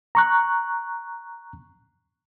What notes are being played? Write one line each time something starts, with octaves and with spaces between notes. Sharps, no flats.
A#5 C#6 F#6